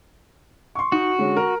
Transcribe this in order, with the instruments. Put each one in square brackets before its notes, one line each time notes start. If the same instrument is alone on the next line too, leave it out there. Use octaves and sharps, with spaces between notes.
[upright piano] C6 C#6
[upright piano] D#4 [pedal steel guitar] F#4
[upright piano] D3 G#3 C#4
A#4